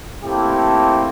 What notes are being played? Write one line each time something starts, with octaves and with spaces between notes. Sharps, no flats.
A3 A#3 C4 E4 G4 A4